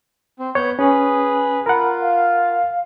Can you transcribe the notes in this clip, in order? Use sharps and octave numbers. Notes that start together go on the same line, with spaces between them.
C4
B3 C#5 F#5 G6
C#4 G#4 B4
F4 A#4 F#5 B5
F5